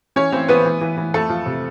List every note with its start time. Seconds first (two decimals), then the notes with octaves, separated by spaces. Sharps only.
0.16 E3 C#4 C#5
0.32 E3 C4 C5
0.48 E3 B3 B4
0.65 E3
0.81 E3
0.98 E3
1.14 F2 A3 A4
1.30 F3
1.46 C3